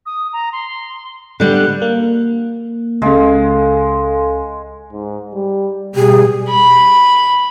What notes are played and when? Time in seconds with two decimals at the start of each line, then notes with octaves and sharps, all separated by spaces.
0.06 D#6
0.33 A#5
0.52 C6
1.40 D3 G3 B3 F#6
1.82 A#3
3.02 C#2 C#3 G#3 A4 F5
4.92 G#2
5.34 G3
5.95 B2 G3 G4 G#4
6.50 B5